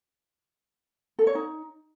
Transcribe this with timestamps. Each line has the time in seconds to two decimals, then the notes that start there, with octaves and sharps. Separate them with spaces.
1.19 A4
1.27 C#5
1.35 D#4